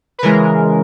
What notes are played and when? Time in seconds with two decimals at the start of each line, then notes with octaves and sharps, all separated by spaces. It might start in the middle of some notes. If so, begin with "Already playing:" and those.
0.19 B4
0.22 C#3 E3 G#3 A#4